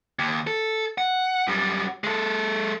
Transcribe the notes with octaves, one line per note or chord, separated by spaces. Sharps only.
D#2
A4
F#5
F#2 G3
G#3 A4